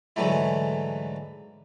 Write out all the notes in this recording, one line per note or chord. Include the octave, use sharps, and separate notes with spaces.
G#2 D3 E3 F#3 A3 E4